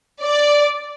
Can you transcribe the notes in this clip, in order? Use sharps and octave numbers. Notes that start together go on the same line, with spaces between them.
D5